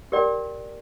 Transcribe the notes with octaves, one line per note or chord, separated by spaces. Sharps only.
G4 A#4 D5 G5